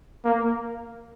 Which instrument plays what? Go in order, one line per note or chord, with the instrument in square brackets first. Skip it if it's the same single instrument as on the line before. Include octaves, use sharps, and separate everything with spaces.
[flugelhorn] A#3